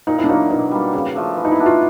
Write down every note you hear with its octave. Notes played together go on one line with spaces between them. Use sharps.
A#2 D#4
E4
D4
F#3 A#3 D#4
B2 D#4
G3 A#3
C#3
F3 A3 D4
E3
D#4
E4
A3 D4 F#4
F4